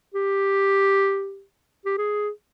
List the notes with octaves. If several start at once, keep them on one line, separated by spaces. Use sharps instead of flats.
G4
G4
G#4